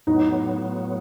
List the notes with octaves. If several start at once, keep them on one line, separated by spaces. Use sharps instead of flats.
A2 F#3 B3 D#4